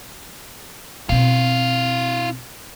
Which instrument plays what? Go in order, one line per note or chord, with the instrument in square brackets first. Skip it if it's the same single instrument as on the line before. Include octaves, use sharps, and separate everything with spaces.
[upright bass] B2 C4 [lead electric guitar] E4 F5